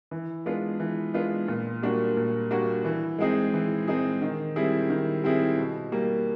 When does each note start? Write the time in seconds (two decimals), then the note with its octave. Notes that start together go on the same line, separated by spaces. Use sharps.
0.11 E3
0.46 G#3 B3 D4 F4
0.80 E3
1.14 G#3 B3 D4 F4
1.48 A#2
1.83 G3 A#3 D4 F#4
2.17 A#2
2.51 G3 A#3 D4 F#4
2.85 E3
3.19 G#3 C4 D#4 G#4
3.54 E3
3.88 G#3 C4 D#4 G#4
4.22 D#3
4.56 G3 C4 E4 G#4
4.90 D#3
5.24 G3 C4 E4 G#4
5.57 B2
5.92 G3 A#3